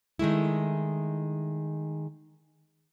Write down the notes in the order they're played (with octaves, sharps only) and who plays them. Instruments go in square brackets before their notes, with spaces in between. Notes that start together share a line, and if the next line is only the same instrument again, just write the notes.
[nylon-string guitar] D#3 G#3 A3 E4